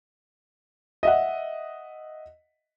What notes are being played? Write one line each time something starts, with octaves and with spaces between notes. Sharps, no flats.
D#5 E5 F#5